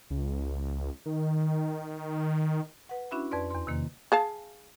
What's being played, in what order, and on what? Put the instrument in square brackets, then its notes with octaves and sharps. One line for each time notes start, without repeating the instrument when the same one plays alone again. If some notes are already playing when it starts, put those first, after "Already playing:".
[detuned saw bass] C#2
D#3
[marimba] B4 F#5
C#4 D4 E4 F#4 E5 B5
F2 B4 D5 C6
E2 C6
C3 D#3 A#3
[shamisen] G#4 F5 A5